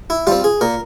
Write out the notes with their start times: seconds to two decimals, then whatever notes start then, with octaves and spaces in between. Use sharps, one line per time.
0.10 E4
0.27 G3 C4 F4
0.44 G#4
0.61 A#2 A#4